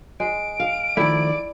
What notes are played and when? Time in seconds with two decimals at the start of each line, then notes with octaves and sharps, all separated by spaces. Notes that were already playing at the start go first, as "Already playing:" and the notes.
0.20 G#3 D7
0.60 F5
0.97 D#3 F3 A3 E4 D5